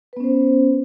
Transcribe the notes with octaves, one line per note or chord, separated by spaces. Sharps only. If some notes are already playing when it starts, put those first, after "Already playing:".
B3 C#4 B4 C5